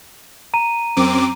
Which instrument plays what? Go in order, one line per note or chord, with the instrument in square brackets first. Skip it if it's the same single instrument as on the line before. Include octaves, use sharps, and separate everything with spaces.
[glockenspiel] A#5 D#7
[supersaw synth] F#2 C4 D6